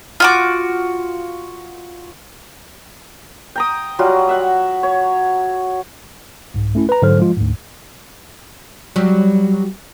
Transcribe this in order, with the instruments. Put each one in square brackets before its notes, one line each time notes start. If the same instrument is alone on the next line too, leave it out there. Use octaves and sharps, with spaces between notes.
[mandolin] F4 F#4 D6
[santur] G5 A#5 D#6
F#3 G3 F4 F#4
E5 F#5
C#5
[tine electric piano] C2 G#2
A3 C#4 E4
B4 A#5
G#2 D3 F#3 A4 C5 F6
F3 G#3 F4
D2 G#2
[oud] F#3 G3